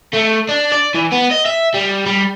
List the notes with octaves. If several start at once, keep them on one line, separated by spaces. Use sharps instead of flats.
A3
D4
D5
E3
B3
D#5
E5
G3
G3